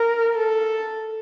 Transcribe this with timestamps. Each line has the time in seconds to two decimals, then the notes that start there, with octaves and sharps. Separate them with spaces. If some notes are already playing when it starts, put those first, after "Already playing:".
Already playing: A#4
0.37 A4